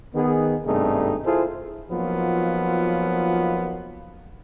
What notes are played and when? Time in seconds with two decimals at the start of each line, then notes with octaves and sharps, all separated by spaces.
0.15 D#3 B3 G#4
0.65 G#1 G2 C3 A3 D#4 G#4
1.25 E4 F4 G#4 A4 C5
1.90 F3 F#3 A#3 B3 D#4 F4